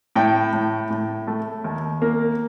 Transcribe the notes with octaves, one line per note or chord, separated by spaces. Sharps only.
A2 G5
A2
A2
A3
D#2
A#3